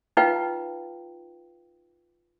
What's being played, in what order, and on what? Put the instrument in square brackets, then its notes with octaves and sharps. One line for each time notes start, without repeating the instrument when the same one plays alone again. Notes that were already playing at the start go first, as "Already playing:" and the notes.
[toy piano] D#4 F4 B4 F5 G5